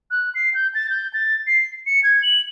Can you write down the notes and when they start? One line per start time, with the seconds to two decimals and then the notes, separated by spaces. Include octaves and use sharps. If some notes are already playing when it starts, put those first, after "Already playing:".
0.11 F#6
0.35 C7
0.54 G6
0.75 A6
0.90 G6
1.14 A6
1.47 C7
1.86 C#7
2.03 G#6
2.23 F#7